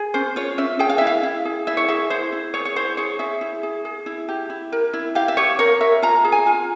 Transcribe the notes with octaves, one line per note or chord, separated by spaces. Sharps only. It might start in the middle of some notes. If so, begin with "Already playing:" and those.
Already playing: G#4
C#4 C5
F4 C#5
C#4 E5
G#4 G5
F5
E4 E5
F5
E4
G#4
E4 E5
C#5
G#4 E5
E4 C5
E4
G#4 C#5
C#5
E4 C5
G#4 C#5
G#4 E5
E4
G#4
G#4
E4
G4
E4
A#4
E4
G4 F5
E5
G4 C#5
A#4 C#5
A#4 E5
F4 A#5
G#4
G#5
F4